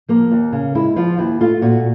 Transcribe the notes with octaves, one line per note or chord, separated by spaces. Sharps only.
F3 A#3
D#2
C#3
G#3 E4
F3 F4
D#2 E4
A3 F4
A#2 F#4